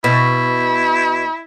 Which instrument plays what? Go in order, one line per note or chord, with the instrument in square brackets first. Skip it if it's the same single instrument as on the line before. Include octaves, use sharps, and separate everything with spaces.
[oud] B2 [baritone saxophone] E4